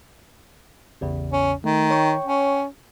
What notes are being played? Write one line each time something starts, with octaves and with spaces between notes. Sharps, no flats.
A1 E2 C#3
C#4
D#3 A3
C#5 G5 C#6
C#4